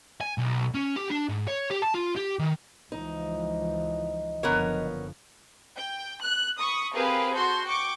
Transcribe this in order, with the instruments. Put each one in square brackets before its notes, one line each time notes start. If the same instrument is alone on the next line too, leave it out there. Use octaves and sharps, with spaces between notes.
[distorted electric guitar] G#5
B1
C#4
G4
D4
G#2
C#5
G4
A5
F4
G4
D#3
[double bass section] C#2 E3 F3 [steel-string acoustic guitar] D#4
[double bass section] F#1 D3 F3 [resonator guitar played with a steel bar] B3 A#4 C#5
[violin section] G5
F#6
B5 C#6 D#6
C4 G4 G#4 A#4 B4 F5
F#4 A4 C6 G6
G5 C#6 D6